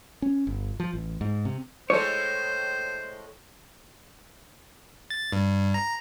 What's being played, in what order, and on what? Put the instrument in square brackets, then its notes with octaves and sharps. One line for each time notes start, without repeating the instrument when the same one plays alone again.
[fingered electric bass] C#4
G1
F3
A1
G#2
C3
[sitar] A2 G#3 A4 [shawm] C5 [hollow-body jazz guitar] C#5
[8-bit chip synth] A6
G2
A#5